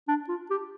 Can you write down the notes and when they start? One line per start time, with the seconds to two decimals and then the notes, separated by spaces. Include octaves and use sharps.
0.08 D4
0.29 F4
0.50 G4